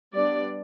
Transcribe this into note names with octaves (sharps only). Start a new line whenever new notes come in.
G3 B3 D4 D5